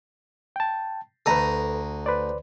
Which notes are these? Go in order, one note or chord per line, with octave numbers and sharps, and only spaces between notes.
G5 A5
D2 A4 B4 A#5 D#6
B4 C5 D5